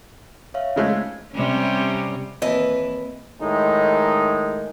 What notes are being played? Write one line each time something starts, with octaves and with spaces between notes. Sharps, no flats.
C#5 E5 F5
C#3 G#3 A3 D#4 C5 G#6
C3 G3 C#4
D#2 E3 A#3 C4 B4 D#5
A2 D#3 G#3 D#4